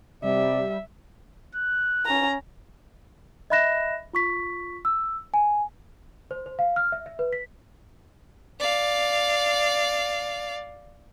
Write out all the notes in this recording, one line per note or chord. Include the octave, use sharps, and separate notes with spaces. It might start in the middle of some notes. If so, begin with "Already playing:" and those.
C3 G3 D5 E5
F#6
C#4 A#5
D#5 E5 B5 F#6 A#6 E7
F4 C#6 B6
E6
G#5
C5
C5
F5
F6
E5
E5
B4
B6
D5 F5